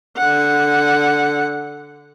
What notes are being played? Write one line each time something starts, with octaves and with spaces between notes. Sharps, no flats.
D3 F#5